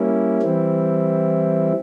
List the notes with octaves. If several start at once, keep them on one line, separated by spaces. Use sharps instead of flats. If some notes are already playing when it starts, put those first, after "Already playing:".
Already playing: G3 A#3 C#4 E4
E3 G3 C4 E4